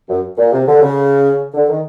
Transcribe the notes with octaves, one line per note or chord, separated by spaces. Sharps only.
F#2
A#2
C3
D3
C#3
D3
D#3